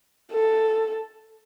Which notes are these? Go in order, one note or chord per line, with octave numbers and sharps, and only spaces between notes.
A4